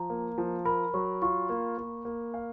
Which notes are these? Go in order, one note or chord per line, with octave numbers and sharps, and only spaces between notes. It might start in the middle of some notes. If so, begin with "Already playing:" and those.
Already playing: F3 A#5
A#3
F3
A#4 B5
F#3 C#6
F4 C#6
A#3
A#3
A#3
F5